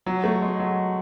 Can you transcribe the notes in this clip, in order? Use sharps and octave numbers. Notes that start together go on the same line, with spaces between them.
F#3
A3
G#3
F#3